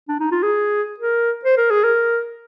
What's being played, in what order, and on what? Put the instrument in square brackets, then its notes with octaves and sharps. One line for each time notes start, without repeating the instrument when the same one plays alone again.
[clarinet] D4
D#4
F4
G#4
A#4
C5
A#4
G#4
A#4